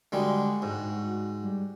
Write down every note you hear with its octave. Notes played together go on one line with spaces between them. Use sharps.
D3 G3 G#3 F#4
G#2
G3